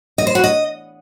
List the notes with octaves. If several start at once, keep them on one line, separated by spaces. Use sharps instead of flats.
D#5
C5
F#4
D#5